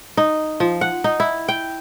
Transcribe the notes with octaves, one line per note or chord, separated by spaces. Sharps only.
D#4
F3
F#5
D#4
E4
G5